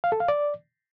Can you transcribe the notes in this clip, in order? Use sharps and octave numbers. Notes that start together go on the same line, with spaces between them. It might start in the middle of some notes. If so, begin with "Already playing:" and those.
F5
A4
F5
D5